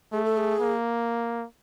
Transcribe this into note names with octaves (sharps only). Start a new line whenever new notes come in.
A3 G#4
A4
G#4
A#3